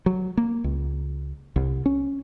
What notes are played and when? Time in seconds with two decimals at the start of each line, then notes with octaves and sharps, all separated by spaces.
0.06 F#3
0.37 A#3
0.64 C#2
1.56 C2
1.86 C#4